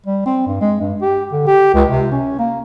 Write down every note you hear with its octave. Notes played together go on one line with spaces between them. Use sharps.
G3
C4
G2
G#3
G2
G4
D3
G4
C#2
C3
C#4
A#3